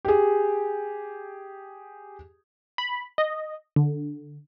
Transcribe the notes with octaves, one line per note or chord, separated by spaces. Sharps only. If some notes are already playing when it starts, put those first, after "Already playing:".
G4 G#4
B5
D#5
D3